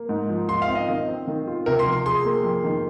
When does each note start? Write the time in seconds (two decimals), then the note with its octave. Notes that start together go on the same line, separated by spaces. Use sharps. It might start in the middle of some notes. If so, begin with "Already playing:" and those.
Already playing: A#3
0.09 G#2
0.29 F3
0.49 F4 C6
0.62 F5
0.68 C4
0.75 D#5
0.89 D#3
1.08 C4
1.27 D#3
1.47 F4
1.66 C3 A#4
1.79 C6
1.86 F3
1.93 C6
2.06 G#4 C6
2.25 A#3
2.44 F2
2.64 D#3